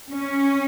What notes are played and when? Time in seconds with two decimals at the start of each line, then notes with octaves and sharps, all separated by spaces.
0.11 C#4